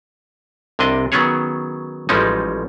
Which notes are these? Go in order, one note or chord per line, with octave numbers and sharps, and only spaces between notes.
C2 C3 D4 D#5
D#3 F#3 B3 C#4 G#4 C#5
A1 F3 G3 G#3 C#4 D#4